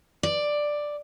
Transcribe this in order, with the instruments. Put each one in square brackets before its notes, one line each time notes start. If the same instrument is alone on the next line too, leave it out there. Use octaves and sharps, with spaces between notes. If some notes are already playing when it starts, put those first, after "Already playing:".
[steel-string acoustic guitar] D5